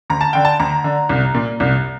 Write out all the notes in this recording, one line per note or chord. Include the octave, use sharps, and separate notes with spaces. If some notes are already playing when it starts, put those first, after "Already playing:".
D2 A#5
A5
D3 G5
A5
D2 A#5
D3
C2
A#2
C2